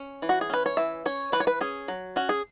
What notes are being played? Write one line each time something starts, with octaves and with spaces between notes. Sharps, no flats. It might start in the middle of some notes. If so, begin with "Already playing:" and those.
Already playing: C#4
E3
F#4
G#4
C#4 B4
C#5
E3 E5
C#4 C#5
E3 B4
C#5
B4
C#4 G#4
F#3
C#4 F#4
G#4